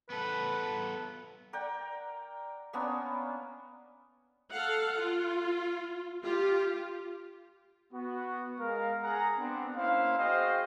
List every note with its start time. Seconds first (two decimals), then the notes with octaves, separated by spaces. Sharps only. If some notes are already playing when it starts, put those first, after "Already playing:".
0.10 B3 A4 B4
1.53 A#4 D5 F#5 G5
2.73 A#3 B3 C#4 D4
4.51 A4 F5 F#5
4.99 F4
6.24 F4 G4
7.93 B3 F#4
8.59 G#3 A#4 F5
9.03 G#4 F#5 A#5
9.38 B3 C4 D4
9.76 A#3 C#4 E4 C5 F5
10.18 F#4 G#4 C5 D#5 F5 G5